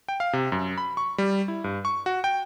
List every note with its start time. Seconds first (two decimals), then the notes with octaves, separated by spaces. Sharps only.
0.09 G5
0.20 F5
0.33 C3
0.52 F#2
0.78 B5
0.97 C#6
1.18 G3
1.48 E4
1.64 G2
1.85 C#6
2.06 F#4
2.24 G5